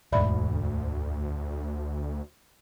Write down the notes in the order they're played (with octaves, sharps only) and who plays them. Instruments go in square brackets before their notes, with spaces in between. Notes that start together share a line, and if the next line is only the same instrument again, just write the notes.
[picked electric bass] E1 G#2 [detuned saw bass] D2 [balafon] D5 E5 B5